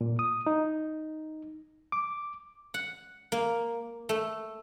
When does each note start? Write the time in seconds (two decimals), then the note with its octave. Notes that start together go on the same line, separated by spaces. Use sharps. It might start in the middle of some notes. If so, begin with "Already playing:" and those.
0.01 A#2
0.19 D#6
0.47 D#4
1.92 D6
2.74 F#5
3.32 A#3
4.09 A3